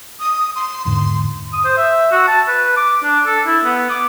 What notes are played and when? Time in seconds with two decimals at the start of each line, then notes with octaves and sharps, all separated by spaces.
0.20 D#6
0.56 C6
0.85 E2 G#2 D3 C6
1.53 D#6
1.65 C5
1.77 E5
2.12 F#4
2.28 A5
2.48 B4
2.77 D6
3.03 D4
3.26 A4
3.46 E4
3.64 B3
3.90 D6